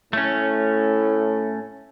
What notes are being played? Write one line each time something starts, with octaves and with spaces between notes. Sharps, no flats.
A2 A3 C#4